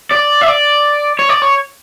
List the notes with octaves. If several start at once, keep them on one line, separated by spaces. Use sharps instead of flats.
D5
E5
D5
C#5
D5
C#5